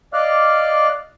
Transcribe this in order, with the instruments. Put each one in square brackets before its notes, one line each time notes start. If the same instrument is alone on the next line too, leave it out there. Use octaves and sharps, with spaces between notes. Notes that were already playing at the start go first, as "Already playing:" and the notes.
[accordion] D5 D#5 F5 D6 F6 F#6